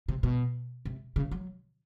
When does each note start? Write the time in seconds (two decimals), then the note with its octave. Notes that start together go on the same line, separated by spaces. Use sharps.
0.08 C3
0.23 B2
0.85 C3
1.16 C#3
1.31 F#3